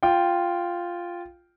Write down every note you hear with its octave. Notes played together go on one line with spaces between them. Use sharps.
F4 G5